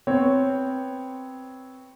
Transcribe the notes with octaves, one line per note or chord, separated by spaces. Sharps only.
B3 C4 C#5